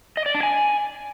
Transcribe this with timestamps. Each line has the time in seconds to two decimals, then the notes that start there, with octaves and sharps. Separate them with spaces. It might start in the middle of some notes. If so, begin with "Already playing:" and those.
0.17 D#5
0.26 D5
0.35 D4
0.43 G#5